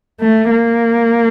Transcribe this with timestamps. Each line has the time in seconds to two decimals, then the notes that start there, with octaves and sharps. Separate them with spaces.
0.21 A3
0.50 A#3